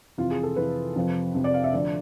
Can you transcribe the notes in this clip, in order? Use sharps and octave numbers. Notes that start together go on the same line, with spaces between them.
F2 C3 E3 F4
G#4
A4
F2 C3 E3 B4
F2 C3 F3
F2 C3 F3
D5
F5
E5
D2 D3 F3 D5